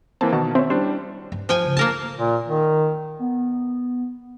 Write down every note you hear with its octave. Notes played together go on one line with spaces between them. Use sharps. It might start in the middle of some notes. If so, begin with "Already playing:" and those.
E3 A#3 C4 A5
B2 D#3 F#4 A5
C4 C#4 E5
G3 D4 E4 C5
G2
F3 G5 G#5
C#3
A#3 D4 A#4 A5
A#2
D#3
B3